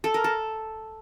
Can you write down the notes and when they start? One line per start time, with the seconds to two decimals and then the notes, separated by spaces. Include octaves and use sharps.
0.04 A4
0.14 A#4
0.24 A4